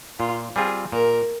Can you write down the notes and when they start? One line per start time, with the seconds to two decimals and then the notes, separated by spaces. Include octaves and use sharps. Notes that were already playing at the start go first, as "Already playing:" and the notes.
0.19 A#2 F4
0.56 G3 C4 F4 G#4
0.92 A#2 A#4